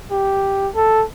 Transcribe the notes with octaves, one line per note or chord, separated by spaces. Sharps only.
G4
A4